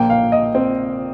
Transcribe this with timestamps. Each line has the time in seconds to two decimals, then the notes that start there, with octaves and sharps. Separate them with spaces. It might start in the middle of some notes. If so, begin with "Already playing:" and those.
Already playing: A#1 A#2 A#3 G5
0.10 F5
0.32 D#5
0.55 C4